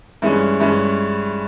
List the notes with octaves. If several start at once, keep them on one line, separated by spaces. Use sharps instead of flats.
G2 E3 G#3 C#4
G2 E3 G#3 C#4